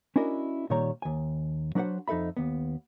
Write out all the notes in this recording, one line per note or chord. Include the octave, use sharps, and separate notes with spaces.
C#4 D4 E4 F#4 A#4 D#5
A#2 D#3 G3 C#5 A#5
D#2 G#5
F#3 D4 F#4 B4 C5 F#5
F2 D#4 A4 E5 B5
D#2 B3